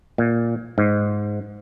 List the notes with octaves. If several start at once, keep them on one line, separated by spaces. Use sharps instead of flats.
A#2
G#2